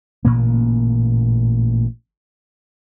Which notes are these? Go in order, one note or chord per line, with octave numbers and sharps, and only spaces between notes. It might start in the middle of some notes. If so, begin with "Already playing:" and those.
A1 A#2 C#3 A#3